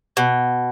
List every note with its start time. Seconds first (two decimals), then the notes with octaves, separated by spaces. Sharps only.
0.17 B2